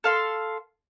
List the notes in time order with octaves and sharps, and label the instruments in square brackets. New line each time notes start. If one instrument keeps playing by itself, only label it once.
[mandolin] A4 F5 C6